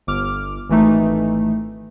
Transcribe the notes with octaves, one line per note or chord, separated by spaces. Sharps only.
G1 D6 F6
G#1 E3 A3 D#4